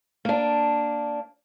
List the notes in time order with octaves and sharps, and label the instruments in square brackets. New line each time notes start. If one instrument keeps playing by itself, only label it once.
[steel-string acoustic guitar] A#3 D4